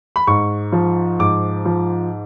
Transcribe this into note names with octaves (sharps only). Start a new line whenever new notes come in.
B5
G#2 C#6
F3
G#2 D6
F3